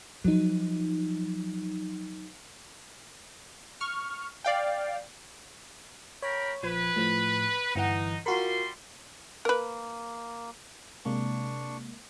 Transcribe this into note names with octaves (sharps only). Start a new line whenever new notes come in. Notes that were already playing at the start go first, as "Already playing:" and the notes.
F3 F#3 D#4
C#6 F6
D5 F5 G5
A#4 C#5 G5 B5
A#1 F3 B4 G#6
A2 F3
G1 E3 D#4 F#5
G3 F4 F#4 A#4 C6
A#3 A#4 B4
C3 G#3 A#3 D4 C#6